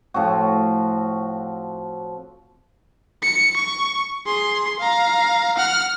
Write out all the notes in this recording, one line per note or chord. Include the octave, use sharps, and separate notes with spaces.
A2 F3 C4 F#4
C#7
C#6
G#4 C6
F5 A#5
F#5 F6